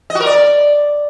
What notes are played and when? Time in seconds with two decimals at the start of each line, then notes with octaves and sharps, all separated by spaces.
0.10 D#5
0.15 F#4
0.20 A#4
0.26 D5